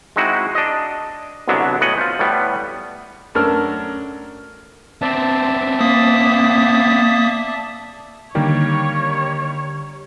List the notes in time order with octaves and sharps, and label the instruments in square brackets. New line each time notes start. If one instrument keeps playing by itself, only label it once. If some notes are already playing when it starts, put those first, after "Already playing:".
[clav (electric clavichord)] G#3 C4 D#4 E4 F#4
D4 D#5
C2 B2 D3 F#3 B3 D4
A2 B3 D#5 F#5 G#5
F4 C5
A2 G3 B3
[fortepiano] F#2 A3 D4 A#4 E6 F6
[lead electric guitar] B3 C4 [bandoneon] D5 E5 A5
[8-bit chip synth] A#3 D#6 B6
[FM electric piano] D3 G4 [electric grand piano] D#3 G3 A#3 [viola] C#5